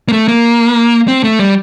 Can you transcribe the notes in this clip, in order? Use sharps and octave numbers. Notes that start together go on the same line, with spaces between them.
A#3
A3
A#3
C4
A3
G3